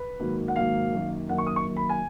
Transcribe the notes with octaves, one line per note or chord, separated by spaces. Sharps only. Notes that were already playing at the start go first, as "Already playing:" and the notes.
Already playing: B4
G#2 D#3 F#3 A#3
F#5
G#2 D#3 F#3 A#3 F5
F#2 D#3 A#3
F#2 D#3 A#3 F#5
C#6
D#6
C#6
F#2 D#3 A#3
B5
G#5